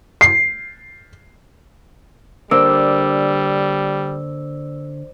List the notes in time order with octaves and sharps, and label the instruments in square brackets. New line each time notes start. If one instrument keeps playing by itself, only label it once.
[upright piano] C7
[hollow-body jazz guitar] D3 A#3 D4 [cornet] G3 [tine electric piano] C5 D5 D6 [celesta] E6